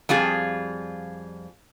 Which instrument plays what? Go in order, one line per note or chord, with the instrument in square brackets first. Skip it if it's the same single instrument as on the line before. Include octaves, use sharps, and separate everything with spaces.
[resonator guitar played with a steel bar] F2 G3 F4 G#4